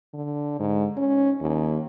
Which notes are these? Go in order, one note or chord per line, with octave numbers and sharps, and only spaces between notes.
D3
G#2
C#4
D#2